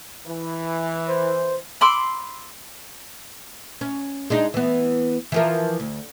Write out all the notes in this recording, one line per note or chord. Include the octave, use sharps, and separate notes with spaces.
E3
C5
B5 C6 D6 E6
C#4
G#3 D4 D#4
E3 B3
E3 F3 A#4
D2